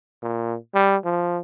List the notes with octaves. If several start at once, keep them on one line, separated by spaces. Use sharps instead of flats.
A#2
G3
F3